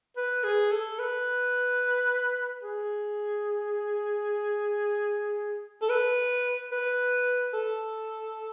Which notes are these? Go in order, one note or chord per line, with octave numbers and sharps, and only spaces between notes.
B4
G#4
A4
B4
G#4
A4
B4
B4
A4